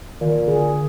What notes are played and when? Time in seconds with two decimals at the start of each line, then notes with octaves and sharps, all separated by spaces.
0.21 A#2 D#3
0.48 D3 G#4